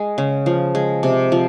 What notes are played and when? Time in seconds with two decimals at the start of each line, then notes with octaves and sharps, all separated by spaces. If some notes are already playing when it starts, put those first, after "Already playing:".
Already playing: G#3
0.18 C#3
0.46 F3
0.75 G#3
1.03 C3
1.32 F3